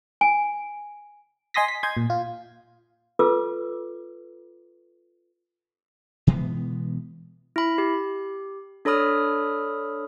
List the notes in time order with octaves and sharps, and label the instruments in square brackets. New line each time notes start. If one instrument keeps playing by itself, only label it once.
[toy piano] G#5
[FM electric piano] D#5 G#5 C6 D#6 A#6 B6
B6
D#5 G#5 C6 G6 G#6
A#2
F4
[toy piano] F4 A4 B4 D6 E6
[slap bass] B2 E3 G#3 B3
[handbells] E4 B5
G4
D4 A4 C#5 B5 D#6 F6